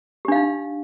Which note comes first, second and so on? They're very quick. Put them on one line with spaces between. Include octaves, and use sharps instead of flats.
G4 D4 F5 D#4